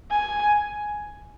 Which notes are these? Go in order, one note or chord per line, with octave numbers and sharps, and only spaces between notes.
G#5